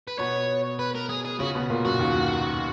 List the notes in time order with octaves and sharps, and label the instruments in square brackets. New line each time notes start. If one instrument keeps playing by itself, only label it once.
[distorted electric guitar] B4
[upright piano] B2 B3 [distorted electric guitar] C#5
[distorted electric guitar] B4
A#4
G#4
G#4
[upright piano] C#3 C#4 [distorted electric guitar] F#4
[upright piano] B2 B3
A#2 A#3
[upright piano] F#2 F#3 [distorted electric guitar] F#4
[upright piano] D#2 D#3